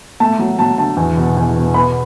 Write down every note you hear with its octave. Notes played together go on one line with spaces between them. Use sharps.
A3 A5
F#3
F#3 A5
D3 A5
E2
B2
E2
B2
B3 B5